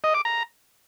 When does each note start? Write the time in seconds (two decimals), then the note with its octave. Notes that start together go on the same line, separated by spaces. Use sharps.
0.04 D#5
0.14 D6
0.25 A#5